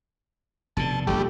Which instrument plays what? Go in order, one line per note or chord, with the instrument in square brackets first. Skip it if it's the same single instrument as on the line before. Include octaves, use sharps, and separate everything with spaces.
[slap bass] F1 B2 D3 [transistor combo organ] A5
[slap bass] F1 A#1 [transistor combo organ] G3 A3 G4